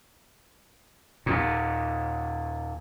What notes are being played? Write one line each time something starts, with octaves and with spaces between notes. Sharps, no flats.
D#2 A#2